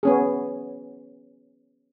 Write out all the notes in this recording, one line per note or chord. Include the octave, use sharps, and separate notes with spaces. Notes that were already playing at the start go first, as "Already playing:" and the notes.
B3 C#4 G#4